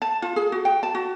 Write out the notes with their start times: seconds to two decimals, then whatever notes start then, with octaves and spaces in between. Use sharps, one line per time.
0.02 A5
0.22 F4
0.36 G#4
0.52 F#4
0.65 G5
0.83 A5
0.95 F#4